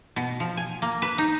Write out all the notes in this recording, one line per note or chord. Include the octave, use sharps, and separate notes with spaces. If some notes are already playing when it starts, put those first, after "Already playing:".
B2
F3
G#5
A#3
B4
D#4